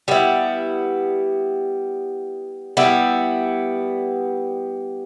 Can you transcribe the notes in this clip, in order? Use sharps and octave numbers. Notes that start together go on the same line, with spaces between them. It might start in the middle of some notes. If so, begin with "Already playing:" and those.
G3 B3 E4
G3 B3 E4